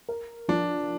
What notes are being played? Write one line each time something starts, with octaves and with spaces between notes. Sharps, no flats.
A#4
F3 D4